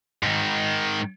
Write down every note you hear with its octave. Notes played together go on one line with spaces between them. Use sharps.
G#2 D#3